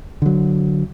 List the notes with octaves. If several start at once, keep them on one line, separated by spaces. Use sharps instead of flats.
D3 F#3